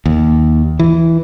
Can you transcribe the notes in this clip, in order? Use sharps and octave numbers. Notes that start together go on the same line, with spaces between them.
D#2
E3